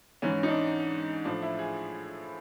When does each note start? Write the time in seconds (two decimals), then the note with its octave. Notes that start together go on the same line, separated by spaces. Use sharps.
0.22 G#2 E3 C#4
0.43 D#4
0.48 D4
1.25 A2 F3 D4
1.42 E4
1.59 G#4